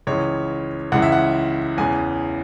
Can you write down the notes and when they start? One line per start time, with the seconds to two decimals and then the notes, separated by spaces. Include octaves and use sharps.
0.07 C#2 C#3 E3 C#5
0.92 C#2 C#3 E3 F#5
1.02 E5
1.12 F#5
1.78 E2 C#3 E3 G#5